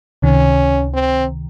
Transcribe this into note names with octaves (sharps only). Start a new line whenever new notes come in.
C#2 C3 D#3 C#4
C4